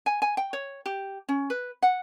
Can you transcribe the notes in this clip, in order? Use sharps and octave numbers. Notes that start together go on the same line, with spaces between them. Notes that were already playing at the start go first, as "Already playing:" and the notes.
G#5
G#5
G5
C#5
G4
C#4
B4
F#5